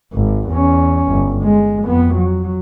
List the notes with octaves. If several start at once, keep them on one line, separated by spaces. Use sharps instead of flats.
G#1
E2 C#4
G1
G#3
F2 B3
F#3